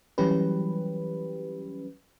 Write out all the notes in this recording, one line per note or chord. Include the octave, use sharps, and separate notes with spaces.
E3 F#3 G3 C#4 G4 B4